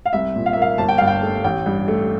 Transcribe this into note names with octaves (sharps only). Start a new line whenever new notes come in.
F5
C2 E5
A#2
F5
E5
A#3 F5
G1 A5
G5
G2 F5
G5
A3
A1 G5
G2
A3